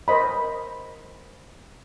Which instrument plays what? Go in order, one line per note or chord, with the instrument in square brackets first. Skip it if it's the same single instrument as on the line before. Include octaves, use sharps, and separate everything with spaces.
[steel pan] A#4 C5 D#5 B5